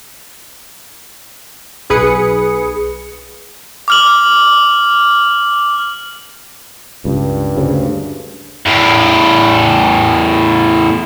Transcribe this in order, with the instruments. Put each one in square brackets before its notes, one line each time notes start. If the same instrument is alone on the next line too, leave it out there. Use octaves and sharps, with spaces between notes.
[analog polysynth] B1 G#4 B4 D#6 C#7
[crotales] D6 F6 F#7
[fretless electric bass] C#2 [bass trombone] G2
[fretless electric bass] D2 C#3
[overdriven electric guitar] E2 A2